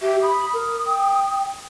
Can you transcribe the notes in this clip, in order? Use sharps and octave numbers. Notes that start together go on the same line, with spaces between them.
G4 E5
B5 D#6
A#4
G5